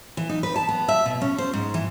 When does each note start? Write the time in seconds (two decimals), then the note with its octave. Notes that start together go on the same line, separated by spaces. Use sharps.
0.17 E3
0.29 D#4
0.43 B4
0.56 A5
0.69 B3
0.88 E5
1.06 B2
1.22 C#4
1.38 C5
1.53 G#2
1.74 E3